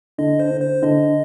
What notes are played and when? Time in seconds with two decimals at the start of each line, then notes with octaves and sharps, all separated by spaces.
0.18 D3 D#5
0.40 C5
0.51 D3
0.61 C5
0.82 D3 D#5